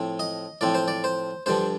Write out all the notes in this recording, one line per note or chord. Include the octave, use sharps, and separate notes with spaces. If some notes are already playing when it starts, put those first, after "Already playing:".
Already playing: A2 F3 C4
D#5
A2 F3 C4 D5
C5
D5
C5
G2 D3 F3 C5